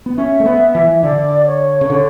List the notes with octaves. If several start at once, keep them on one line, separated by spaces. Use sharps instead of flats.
B3
C#4 E5
A3
B3
E3
D3 D5
C#5
C#3
D3